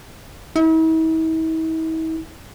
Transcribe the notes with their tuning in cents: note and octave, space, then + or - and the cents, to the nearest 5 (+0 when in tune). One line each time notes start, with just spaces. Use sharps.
E4 -45